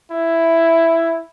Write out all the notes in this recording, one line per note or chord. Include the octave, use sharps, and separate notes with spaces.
E4